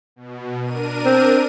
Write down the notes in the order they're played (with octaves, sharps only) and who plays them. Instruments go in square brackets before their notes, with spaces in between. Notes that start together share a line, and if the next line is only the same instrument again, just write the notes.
[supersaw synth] B2
D4 A#4 D#7
[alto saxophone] C4